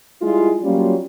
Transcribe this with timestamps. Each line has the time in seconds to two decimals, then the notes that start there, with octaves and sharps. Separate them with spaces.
0.22 G3 G#3 E4 F4
0.62 F#3 G3 A#3 C#4 F4